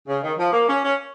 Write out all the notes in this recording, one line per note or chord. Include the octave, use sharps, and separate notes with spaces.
C#3
D#3
F3
A#3
C#4
C#4